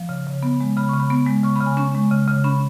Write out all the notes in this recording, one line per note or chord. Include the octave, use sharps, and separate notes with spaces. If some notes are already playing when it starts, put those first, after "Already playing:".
Already playing: F3
C#3
C#3
B3
G#3
C#3 B5
C#3 C#6
B5
B3
G#3
C#3 C#6
B5
C#3
G#5
C#4 C#6
G#3
C#3
C#3
C#4 B5